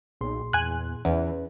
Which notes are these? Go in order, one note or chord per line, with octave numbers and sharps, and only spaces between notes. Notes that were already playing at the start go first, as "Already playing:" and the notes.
B1 A#2 G#4 C6
E2 G#5 F#6
E2 E3 C#4 B4